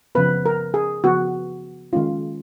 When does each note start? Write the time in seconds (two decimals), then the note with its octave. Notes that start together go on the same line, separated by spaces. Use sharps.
0.15 C#3 F3 B3 B4
0.46 A#4
0.74 G#4
1.04 C#3 F3 B3 F#4
1.93 D#3 G#3 C#4 F4